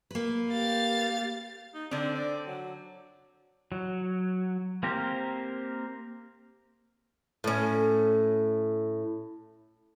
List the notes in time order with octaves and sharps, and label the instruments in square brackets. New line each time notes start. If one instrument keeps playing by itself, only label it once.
[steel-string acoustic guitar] A#3 B4
[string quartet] G4 F5 A6
[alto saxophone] D#4
[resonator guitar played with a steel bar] D3 C4 [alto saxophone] D4
[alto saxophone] D5
F#3
[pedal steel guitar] F#3
A#3 C4 G4 A#4 C5
[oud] A2 C#4